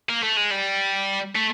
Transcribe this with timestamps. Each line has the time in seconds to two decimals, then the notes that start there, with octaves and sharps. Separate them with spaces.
0.09 A#3
0.23 A3
0.36 G#3
0.50 G3
1.35 A3